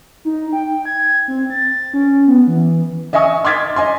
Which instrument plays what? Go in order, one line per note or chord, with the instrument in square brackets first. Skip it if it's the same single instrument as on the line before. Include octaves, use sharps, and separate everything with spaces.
[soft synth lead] D#4
G5
G#6
C4
A6
C#4
B3
E3
[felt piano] D#5 E5 G#5 C#6 D#6
C6 D6 F6 G#6 A6 B6
D#5 G#5 C6